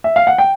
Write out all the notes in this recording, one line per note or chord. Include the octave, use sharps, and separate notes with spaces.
E5
F5
F#5
G5